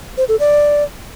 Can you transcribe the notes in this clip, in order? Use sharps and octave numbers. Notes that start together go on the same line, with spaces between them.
C5
A4
D5